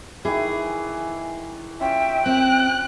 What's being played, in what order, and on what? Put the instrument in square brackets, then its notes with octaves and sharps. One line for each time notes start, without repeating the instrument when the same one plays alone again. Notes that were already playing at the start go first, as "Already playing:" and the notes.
[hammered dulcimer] D#3 E3 [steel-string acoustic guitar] G#4
[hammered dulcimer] C#4 F4 [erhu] E5 [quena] G5
[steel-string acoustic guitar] C4 [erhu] F#6